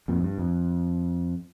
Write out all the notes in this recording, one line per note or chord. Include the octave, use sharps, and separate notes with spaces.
F2 A#2
G2
F2